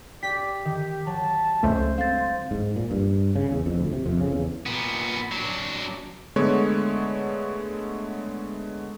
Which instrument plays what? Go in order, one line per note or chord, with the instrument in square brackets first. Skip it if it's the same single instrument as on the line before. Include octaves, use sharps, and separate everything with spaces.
[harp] G4 [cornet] D5 [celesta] G5 [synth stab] B6
[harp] D#3 [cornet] G4
[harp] F#3 [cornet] A5
[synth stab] C#2 A3 [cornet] C5
[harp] C4 [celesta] F5 A6
[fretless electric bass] G#2
A#2
G2
C#3
E2
F2
D2
C3
F2
C#3
E2
[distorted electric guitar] A#2 B3
F#3 D4
[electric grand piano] D3 G#3 A3 B3 C#5